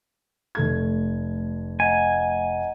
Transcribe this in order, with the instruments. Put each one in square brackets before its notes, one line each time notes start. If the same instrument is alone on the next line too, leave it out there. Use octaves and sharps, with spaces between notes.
[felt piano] F1 A3 G#6
[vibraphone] D#5 F#5 A#5 [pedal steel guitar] G#5